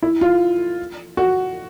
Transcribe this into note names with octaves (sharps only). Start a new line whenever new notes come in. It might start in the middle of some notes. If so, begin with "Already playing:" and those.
E4
F4
F#4